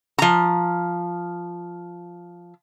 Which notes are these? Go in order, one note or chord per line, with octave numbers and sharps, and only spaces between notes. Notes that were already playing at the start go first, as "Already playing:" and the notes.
F3 A#5